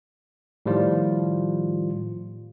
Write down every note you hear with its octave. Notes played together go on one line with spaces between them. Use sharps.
A2 D#3 F3 G3 F4